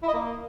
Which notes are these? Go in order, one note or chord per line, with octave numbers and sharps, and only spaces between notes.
E4
D#5
A#3